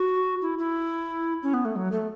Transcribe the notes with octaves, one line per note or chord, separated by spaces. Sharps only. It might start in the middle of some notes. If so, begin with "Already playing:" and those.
Already playing: F#4
E4
E4
C#4
B3
A3
F#3
A3